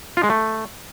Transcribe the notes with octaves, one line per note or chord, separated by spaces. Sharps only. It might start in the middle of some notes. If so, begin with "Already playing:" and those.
F4
G#3
A3